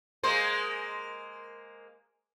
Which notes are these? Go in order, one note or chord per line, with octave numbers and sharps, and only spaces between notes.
G#3 A#3 C5